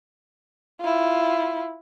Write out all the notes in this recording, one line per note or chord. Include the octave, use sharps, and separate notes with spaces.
E4 F4